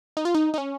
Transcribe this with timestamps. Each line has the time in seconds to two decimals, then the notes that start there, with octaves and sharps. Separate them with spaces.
0.17 D#4
0.25 F4
0.35 D#4
0.54 D#4
0.58 C#4